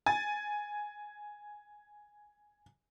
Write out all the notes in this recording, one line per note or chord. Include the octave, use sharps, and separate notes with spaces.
G#5 A6